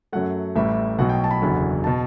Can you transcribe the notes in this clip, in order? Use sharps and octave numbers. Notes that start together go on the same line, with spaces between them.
F#2 F#3 A3 F#5
A1 A2 G3 E5
B1 B2 F#3 F#5
G5
A5
B5
F#1 E2 D3 F#3
B2 A5